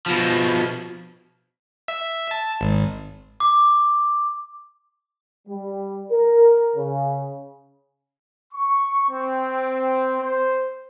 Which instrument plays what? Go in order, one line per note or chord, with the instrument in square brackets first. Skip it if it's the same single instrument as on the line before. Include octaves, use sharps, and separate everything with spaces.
[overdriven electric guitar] B2 F3
[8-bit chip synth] E5
A5
G#1
[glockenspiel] D6
[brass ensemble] G3
A#4
C#3
[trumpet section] C#6
C4
C5